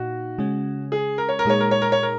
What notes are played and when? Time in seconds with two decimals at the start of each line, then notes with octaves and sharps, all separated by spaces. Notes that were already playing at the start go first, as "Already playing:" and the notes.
Already playing: A#2 D#4 F#4
0.38 C#3 G#3 C#4
0.92 G#4
1.18 A#4
1.29 C#5
1.39 A#4
1.45 A#2 G#3 D#4 G#4 C#5
1.60 A#4
1.71 C#5
1.82 A#4
1.92 C#5
2.03 A#4